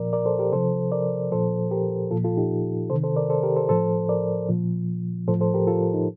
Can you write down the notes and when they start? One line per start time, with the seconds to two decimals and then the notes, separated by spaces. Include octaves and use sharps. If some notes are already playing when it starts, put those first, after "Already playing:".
Already playing: A#2 F3 A#4 D5
0.13 A#4 D5
0.26 A4 C5
0.39 G4 A#4
0.52 C3 F3 A4 C5
0.92 A#4 D5
1.32 A#2 F3 A4 C5
1.71 G4 A#4
2.11 A#2 F3 F4 A4
2.24 F4 A4
2.37 D#4 G4
2.90 C3 D#3 A4 C5
3.03 A4 C5
3.16 A#4 D5
3.30 A4 C5
3.43 G4 A#4
3.56 A4 C5
3.69 A2 F3 A4 C5
4.09 A#4 D5
4.49 A#2 F3
5.28 A2 F3 A4 C5
5.41 A4 C5
5.54 G4 A#4
5.67 F4 A4
5.94 D#4